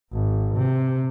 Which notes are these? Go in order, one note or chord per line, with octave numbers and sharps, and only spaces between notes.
G#1
C3